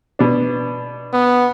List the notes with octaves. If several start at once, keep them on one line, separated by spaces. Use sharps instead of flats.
B2 D4
B3